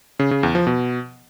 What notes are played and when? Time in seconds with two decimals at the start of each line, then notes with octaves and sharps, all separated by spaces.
0.19 C#3
0.31 C#3
0.43 E2
0.55 F3
0.67 B2